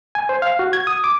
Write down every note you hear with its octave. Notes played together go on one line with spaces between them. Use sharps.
G#5
C5
F5
F#4
G#6
D#6
D6